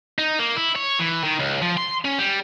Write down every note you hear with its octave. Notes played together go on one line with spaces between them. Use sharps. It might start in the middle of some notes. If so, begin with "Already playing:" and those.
D#4
A#3
E4
C#5
E3
D#3
C#2
F3
C6
C#4
G3